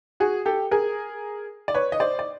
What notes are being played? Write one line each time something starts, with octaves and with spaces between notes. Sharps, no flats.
F#4 G#4
G4 A4
G#4 A#4
D5
B4 C#5
D#5
C5 D5
D5